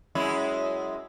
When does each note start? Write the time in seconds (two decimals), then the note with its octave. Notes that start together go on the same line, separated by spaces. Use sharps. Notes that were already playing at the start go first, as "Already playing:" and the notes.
0.15 F#2 G#3 E4